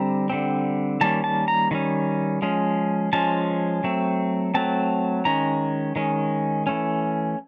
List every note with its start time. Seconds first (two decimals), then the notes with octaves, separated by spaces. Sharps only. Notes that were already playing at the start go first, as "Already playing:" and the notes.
Already playing: D3 G3 C4 A#5
0.30 D3 G3 C4
1.01 D#3 G3 A#3 C#4 A5
1.24 A5
1.48 A#5
1.71 D#3 G3 C#4
2.42 F3 G#3 C#4
3.13 F3 G#3 C#4 A5
3.84 F#3 A3 C4
4.54 F#3 A3 C4 A5
5.25 D#3 G#3 C#4 A#5
5.96 D#3 G#3 C#4
6.67 E3 A3 C#4